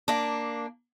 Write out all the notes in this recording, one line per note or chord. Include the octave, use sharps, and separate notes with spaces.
A#3 D4